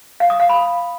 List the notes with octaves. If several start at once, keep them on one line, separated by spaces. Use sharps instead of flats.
F5
D#6
F5
B5